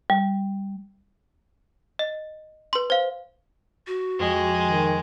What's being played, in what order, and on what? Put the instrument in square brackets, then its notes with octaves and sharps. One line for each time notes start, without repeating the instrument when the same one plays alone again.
[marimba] G3
[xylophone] D#5
B4 C6
C5 F5
[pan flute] F#4
[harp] F2 [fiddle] G#3
[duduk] D#3